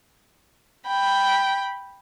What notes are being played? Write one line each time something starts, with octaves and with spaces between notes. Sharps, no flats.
G5 B5